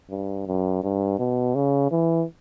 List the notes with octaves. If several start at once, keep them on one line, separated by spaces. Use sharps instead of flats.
G2
F#2
G2
B2
C#3
E3